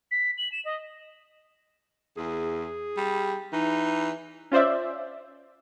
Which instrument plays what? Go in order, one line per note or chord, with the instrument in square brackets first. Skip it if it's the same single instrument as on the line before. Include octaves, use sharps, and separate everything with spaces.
[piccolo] B6
F#7
E7
D#5
[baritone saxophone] E2 [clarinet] G#4
[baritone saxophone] G3
[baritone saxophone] E3 [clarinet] D#4
[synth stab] C#4 F4 C5 D5 E5